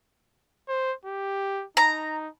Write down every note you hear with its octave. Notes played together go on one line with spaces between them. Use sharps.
C5
G4
D#4 A#5